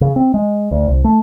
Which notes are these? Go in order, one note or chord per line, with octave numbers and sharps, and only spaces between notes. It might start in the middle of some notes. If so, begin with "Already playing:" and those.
C#3
C4
G#3
D2
C2
A3